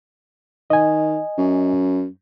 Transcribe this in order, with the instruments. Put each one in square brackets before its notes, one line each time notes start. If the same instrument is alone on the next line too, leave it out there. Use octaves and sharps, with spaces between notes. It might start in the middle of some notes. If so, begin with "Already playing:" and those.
[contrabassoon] D#3 [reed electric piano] D#5 G#5
[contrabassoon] F#2